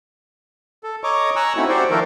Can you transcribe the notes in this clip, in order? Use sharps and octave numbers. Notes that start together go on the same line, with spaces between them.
A4
C#5 D#5 A#5 C#6 D6
G#5 A#5 C#6 E6 F#6
A3 C4 C#4 D#4 E4 F#4
F#4 G4 C5 D5 F#5 G5
D#3 F3 A3 A4 A#4